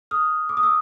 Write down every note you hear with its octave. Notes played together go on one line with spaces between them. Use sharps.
D#6 F6
D6
D#6
D6 E6